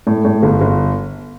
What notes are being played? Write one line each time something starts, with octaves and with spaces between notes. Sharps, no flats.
A2
A2
G1
G1